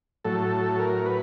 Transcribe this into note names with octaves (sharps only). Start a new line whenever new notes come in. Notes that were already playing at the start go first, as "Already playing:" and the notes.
A2 F#3 A4
A#4
B4